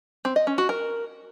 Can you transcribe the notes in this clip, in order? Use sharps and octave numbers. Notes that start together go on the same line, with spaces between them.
C4
D#5
C#4
F#4
A#4